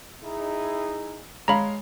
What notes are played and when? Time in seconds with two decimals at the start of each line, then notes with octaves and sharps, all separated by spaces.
0.23 D#4 E4 G#4
1.48 G#3 C#5 F5 A#5 B5